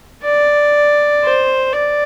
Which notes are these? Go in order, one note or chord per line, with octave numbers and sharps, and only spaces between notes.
D5
C5
D5